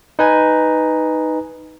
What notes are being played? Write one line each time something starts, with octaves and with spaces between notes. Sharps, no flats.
D#4 B4 G#5